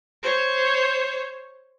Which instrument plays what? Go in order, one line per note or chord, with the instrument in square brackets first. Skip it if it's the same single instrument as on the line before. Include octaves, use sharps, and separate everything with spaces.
[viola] C5 C#5